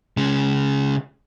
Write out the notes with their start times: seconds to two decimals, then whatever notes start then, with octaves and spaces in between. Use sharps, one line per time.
0.17 C#3 G#3